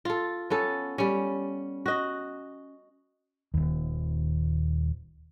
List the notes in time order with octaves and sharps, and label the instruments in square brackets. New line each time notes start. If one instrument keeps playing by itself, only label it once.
[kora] F4 A4
B3 C#4 A4
G3 C#4
F#4 D#5
[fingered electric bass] D#1 D#2